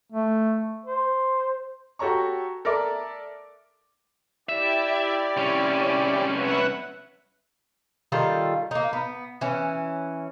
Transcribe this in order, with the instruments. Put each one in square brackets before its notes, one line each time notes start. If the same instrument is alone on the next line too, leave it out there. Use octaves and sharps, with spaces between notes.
[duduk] A3
C5
[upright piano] F#4 G4 A4 C#5 A#5 C#6
A4 A#4 D5 E5 D6
[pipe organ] E4 G4 D5 [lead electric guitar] E5
[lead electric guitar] C2 C#4
[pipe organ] B4 E5 F#5
[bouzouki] D#3 G3 F4 A4
A#3 D#4
B3
E3 C#4